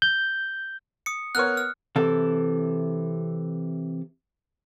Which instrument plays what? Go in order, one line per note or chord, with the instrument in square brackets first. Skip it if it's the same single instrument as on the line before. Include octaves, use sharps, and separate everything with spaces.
[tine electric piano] G6
[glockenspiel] D#6 C#7
[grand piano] B3 A#4 C#5 [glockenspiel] F6 F#6
[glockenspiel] F6
[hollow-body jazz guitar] C3 E3 E4 A4